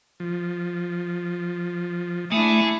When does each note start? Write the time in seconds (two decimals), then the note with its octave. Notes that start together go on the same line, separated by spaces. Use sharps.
0.20 F3
2.32 A3 D4 E4 G#4